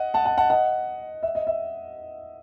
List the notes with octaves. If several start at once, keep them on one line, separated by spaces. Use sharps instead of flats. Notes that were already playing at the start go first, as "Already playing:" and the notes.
Already playing: D#5 F#5
F#5 A5
F#5 A5
F#5 A5
D#5 F#5
E5
D#5
E5